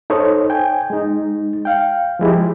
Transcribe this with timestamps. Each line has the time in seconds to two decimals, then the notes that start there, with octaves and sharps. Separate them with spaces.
0.10 D#4 A4 C5 C#5 D#5
0.50 G5 G#5
0.90 G#3 D#4
1.65 F5 G5
2.19 F3 G#3 E4 G4